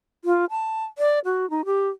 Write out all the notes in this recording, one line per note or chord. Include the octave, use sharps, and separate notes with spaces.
F4
A5
D5
F#4
D#4
G4